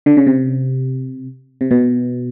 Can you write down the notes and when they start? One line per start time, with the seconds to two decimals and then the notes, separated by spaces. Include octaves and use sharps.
0.06 D3
0.17 C#3
0.27 C3
1.61 C3
1.71 B2